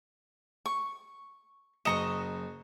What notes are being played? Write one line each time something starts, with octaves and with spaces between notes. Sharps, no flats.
C#6
F#1 D#5 A#5 C#6 C#7 E7